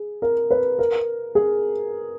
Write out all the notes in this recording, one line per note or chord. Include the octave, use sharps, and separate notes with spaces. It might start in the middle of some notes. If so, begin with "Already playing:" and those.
Already playing: G#4
A#4
B4
A#4
G#4